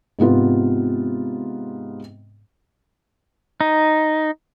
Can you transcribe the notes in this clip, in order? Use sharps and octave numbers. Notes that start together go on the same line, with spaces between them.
G#2 C3 B3 F4
D#4